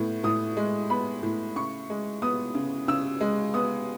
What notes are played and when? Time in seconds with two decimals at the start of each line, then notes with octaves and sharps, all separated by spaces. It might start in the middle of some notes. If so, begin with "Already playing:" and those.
Already playing: A2 B3
0.24 A2 D#6
0.57 G#3
0.90 B3 B5
1.23 A2
1.56 C#3 C#6
1.90 G#3
2.22 B3 D#6
2.55 C#3
2.88 C#3 E6
3.21 G#3
3.54 B3 D#6